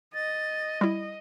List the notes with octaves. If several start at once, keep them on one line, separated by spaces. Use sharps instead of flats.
D#5 A6
G3 E4